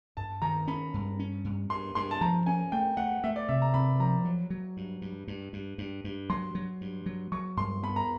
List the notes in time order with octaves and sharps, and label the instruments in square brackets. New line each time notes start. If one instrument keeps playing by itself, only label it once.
[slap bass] G2 [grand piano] A5
[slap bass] D#3 [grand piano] A#5
[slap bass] C#4 [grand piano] B5
[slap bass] G2
C#4
G2
[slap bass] G2 [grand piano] C6
[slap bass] G2 [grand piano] C6
[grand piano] A5
[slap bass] F3 [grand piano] A#5
[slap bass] C#4 [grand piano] G#5
[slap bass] A3 [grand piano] G5
[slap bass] A3 [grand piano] F#5
[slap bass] A3 [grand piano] E5
[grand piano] D5
[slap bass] C3 [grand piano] E5
[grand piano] A#5
[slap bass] C3 [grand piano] B5
[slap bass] F3 [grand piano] A#5
[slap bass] F#3
F#3
G2
G2
G2
G2
G2
G2
[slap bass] F#3 [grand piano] C6
[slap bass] F#3
G2
F#3
[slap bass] F#3 [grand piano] C#6
[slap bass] G2 [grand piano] C6
[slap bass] B3 [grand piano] B5
[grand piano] A#5